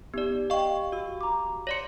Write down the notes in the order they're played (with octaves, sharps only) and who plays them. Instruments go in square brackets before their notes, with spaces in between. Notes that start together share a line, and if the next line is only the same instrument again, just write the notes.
[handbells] B3 D#4 D5 [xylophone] G4
[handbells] D#5 C#6 [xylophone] F5 G5
[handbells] F#4 E6
[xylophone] A#5 D6
[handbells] C#5 D5 C6 [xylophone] A#6 C#7